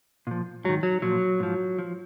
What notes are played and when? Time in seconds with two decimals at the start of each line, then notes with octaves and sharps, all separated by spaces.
0.27 A#2 F3
0.64 G#2 D#3 F#3
0.83 F#3
1.02 A#2 F3 F#3
1.40 G#2 F3
1.79 F3